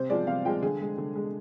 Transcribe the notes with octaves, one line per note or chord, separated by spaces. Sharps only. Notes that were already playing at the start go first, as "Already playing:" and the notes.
Already playing: C3 C5
F3 G#3 D5
C3 F5
F3 G#3 G5
D3 G#4
G#3
D3
G#3